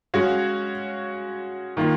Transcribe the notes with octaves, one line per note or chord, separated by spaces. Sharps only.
G#3 C#4 F#4 C#5 F5
D#3 A#3 F4